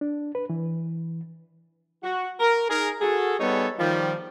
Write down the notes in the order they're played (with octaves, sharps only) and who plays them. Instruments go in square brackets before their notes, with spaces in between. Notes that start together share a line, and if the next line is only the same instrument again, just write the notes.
[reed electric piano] D4
B4
E3
[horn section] F#4
A#4
D#4 G#4 A#4
F#4 G#4 A4
G3 B3 D#4 G#4 A4 C#5
D#3 F3 G3